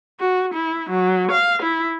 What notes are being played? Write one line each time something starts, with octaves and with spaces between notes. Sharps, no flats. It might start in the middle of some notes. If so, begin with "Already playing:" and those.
F#4
E4
F#3
F5
E4